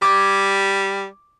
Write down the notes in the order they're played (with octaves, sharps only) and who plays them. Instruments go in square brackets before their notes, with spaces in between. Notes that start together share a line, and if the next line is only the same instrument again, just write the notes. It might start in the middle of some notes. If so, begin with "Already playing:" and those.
[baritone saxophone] G3 [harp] D6 G#6